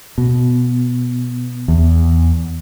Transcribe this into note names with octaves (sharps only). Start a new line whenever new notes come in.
B2
E2